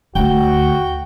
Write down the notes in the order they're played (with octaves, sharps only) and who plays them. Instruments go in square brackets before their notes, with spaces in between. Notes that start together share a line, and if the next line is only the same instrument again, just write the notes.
[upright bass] D2 A3 [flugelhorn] F#4 [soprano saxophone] G5